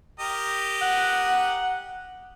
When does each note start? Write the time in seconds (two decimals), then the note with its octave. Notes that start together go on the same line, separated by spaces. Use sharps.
0.20 G4 A#4 D#5
0.82 F#5